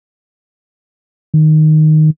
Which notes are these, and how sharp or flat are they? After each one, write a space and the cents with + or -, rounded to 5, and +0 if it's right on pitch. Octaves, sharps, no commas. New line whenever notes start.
D#3 -5